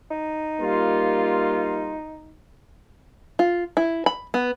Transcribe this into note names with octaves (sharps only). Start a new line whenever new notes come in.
D#4
G3 A#3 F4
F4
E4
B5
B3